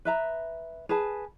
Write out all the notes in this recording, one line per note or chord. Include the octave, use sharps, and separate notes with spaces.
B4 E5 A#5
G#4 B4 A5